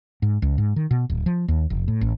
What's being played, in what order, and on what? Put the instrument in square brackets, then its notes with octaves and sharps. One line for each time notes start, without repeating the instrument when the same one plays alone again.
[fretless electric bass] G#2
C#2
G#2
D#3
B2
D1
F3
D#2
F1
A2
A1